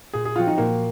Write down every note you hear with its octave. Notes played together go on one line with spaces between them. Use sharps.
A#2 G#4
G#4
F3 C4 F4 F#4
D#4
A#2 A#3